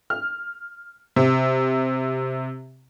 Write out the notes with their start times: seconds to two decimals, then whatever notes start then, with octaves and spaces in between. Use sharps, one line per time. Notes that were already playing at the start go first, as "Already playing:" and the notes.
0.10 F6
1.16 C3